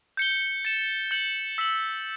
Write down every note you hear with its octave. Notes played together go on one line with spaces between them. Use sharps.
G6 C#7 G7
A6 C#7 E7
G6 C#7 F#7
E6 B6 F#7